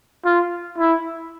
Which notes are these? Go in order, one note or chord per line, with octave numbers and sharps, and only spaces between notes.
F4
E4